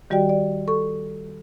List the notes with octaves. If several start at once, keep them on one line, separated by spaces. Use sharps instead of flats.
D#3 G3 F#4 G4 D5 G5
D5
A4 C#6